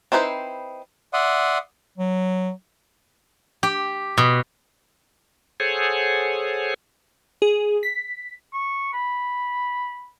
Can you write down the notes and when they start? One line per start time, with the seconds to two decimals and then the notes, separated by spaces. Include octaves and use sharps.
0.12 C4 D#4 E4 B4 C5
1.13 D5 E5 F#5 C6 D#6
1.98 F#3
3.63 G4
4.18 B2
5.60 G#4 A4 C5 C#5 F#5 G#5
7.42 G#4
7.83 B6
8.54 C#6
8.93 B5